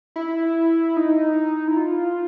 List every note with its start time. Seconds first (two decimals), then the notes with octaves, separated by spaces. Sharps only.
0.16 E4
0.97 D#4
1.68 E4
1.77 F4